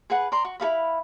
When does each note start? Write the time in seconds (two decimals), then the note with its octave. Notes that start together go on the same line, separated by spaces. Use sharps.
0.10 G#4 B4 F#5
0.32 D5 A#5 C6
0.45 F#4
0.60 E4 A4 F5 B5